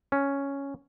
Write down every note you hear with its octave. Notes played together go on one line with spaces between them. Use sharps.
C#4